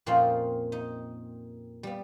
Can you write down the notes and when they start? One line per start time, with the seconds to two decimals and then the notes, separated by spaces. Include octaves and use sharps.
0.06 F2 A#2 C4 C#4 D#4 F4
0.72 D#4
1.83 G3 B3